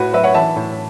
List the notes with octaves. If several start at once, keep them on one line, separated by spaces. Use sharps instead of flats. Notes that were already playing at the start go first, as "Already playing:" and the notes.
Already playing: A2 F#4 B4
F#3 B4 E5
C#5 F#5
E3 E5 A5
A2